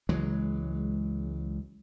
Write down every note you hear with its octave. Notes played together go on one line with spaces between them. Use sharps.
C#2 E3 F#3 G#3